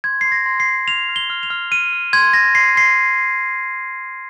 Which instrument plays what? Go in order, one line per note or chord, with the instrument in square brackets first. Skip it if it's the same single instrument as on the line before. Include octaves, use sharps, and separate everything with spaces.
[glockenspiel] C6 G#6
C6 C7
A#6
C6
C7
C6
F6 F7
F6
G7
F6
F7
F6
F6 D#7
F6
C6 G#6
C6 A#6
C6 C7
C6 C7